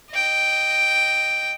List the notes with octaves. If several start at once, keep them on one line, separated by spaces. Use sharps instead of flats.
D#5 G5